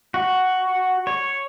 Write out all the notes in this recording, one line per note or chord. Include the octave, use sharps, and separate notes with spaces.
F#4
C#5